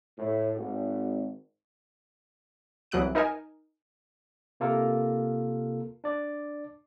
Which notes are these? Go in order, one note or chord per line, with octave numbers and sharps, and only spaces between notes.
A2
G#1
C2 E3 F#3 D#6 F#6 D7
D#4 A#4 D#5 G#5
C3 A#3 F4 A4 A#4
D4 D5